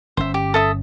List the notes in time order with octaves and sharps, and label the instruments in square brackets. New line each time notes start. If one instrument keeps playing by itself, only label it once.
[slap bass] G1 C#4 [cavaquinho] C5 E5
[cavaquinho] G4
A4 E5 D#6